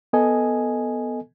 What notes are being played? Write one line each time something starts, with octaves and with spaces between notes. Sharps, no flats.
B3 A4 D#5 G#5